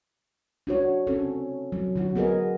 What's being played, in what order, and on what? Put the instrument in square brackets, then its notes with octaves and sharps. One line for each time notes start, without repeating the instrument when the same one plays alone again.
[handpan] D4 F#4 C#5
C4 C#4 A4
F#3
D3 F#4
B3 G#4 A#4 D#5